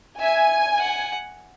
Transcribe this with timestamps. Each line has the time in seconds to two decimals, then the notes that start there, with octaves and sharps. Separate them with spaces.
0.20 E5 G#5
0.79 F#5